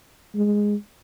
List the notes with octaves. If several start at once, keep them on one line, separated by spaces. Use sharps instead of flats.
G#3